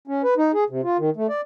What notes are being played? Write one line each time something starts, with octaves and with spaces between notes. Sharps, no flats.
C#4
B4
D#4
G#4
C3
F4
D#3
A3
D5